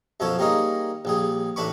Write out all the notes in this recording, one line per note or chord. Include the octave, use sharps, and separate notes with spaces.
F#2 B2 F3 A4 C#5
G3 A#3 C#4 D#4 G#4
A#1 G3 G#4
A1 A2 D4 B4 B5 C#6